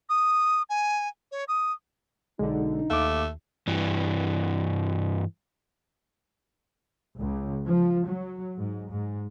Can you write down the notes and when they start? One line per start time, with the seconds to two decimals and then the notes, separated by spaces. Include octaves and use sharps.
0.09 D#6
0.69 G#5
1.32 C#5
1.48 D#6
2.39 B1 D3 G#3 D#4
2.90 D#2 A3 F5 D6
3.67 G2 E3
7.17 C#2
7.66 F3
8.05 F#3
8.57 G#2
8.88 G#2